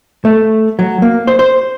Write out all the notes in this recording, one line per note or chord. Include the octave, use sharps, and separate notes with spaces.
A3
F#3
A#3
C5
C5